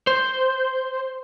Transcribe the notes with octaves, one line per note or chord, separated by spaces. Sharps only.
C5